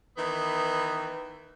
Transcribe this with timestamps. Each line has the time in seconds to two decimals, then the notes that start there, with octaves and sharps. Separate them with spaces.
0.17 D#3 E3 B3